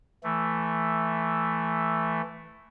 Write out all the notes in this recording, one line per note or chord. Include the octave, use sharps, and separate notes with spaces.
E3 A3